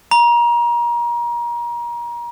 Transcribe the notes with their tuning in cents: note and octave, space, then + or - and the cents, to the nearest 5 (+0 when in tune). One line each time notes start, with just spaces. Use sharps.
A#5 +30